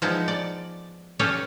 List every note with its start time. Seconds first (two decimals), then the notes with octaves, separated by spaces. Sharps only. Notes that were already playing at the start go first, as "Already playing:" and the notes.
0.02 F3 G#3 B3 D#4 E4
0.28 D5
1.19 C#4 G4 A4 B4 C#5 F5